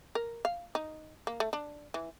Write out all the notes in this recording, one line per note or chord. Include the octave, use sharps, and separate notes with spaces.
A#4
F5
D#4
A#3
A3
D4
E3